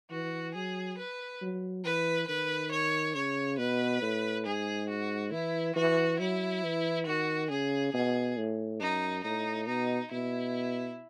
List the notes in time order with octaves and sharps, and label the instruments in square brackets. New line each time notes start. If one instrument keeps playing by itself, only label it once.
[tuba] E3 [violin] F#4
[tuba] F#3 [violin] G#4
[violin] B4
[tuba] F#3
[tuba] E3 [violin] B4
[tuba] D#3 [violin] B4
[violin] C#5
[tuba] C#3 [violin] C#5
[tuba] B2 [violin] B4
[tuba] A2
[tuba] G#2 [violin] G#4
[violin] F#4
[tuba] E3 [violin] E4
[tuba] E3 [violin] F#4
[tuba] F#3 [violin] E4
[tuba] E3
[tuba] D#3 [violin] F#4
[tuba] C#3 [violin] G#4
[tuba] B2 [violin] G#4
[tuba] A2
[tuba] F#2 [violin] D#4
[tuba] A2 [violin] D#4
[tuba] B2 [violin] D#4
[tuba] B2 [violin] E4